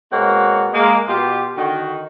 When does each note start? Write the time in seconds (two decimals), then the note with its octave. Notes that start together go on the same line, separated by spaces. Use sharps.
0.12 B2 G#3 A#3 C4 C#5 F#5
0.72 G#3 A#3
1.07 B2 F4 G4
1.55 D3 D#3 F#4